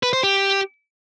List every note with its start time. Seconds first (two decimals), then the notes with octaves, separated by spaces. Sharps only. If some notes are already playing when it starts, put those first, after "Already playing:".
0.03 B4
0.13 C5
0.23 G4